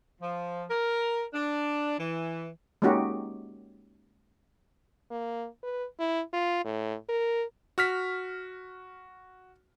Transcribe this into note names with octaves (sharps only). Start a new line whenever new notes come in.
F3
A#4
D4
E3
G#3 A#3 C#4 D#4 F#4 G4
A#3
B4
E4
F4
A2
A#4
F#4 F6 B6